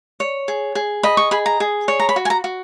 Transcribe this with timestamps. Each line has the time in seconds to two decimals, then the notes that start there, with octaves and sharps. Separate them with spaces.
0.20 C#5
0.48 G#4
0.75 G#4
1.03 D#5 B5
1.17 C#6
1.31 G#4 B5
1.46 A#5
1.60 G#4
1.88 C#5
2.00 A#5
2.09 B5
2.16 F#4
2.25 G#5
2.30 A#5
2.44 F#4